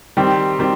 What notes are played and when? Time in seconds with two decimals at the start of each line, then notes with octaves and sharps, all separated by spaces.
0.17 D#3 G3 C4
0.59 D#3 G3 C4